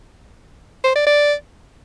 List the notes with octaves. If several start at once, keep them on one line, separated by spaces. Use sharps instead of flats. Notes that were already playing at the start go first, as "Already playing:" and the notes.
C5
D5
D5